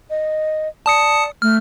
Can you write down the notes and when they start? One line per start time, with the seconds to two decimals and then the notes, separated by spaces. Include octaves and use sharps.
0.10 D#5
0.86 D5 A5 D#6 C#7
1.42 A3 F6